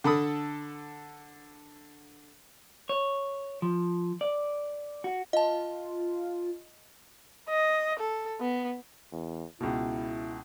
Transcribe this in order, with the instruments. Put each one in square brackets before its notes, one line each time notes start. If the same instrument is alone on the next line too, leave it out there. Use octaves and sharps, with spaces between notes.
[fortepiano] D3 A4 B5 D#6
[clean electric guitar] C#5
F3
D5
F#4
[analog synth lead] F4 [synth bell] D#5 A5
[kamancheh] D#5
A4
B3
[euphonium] E2
[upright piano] C#2 B2 [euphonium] E4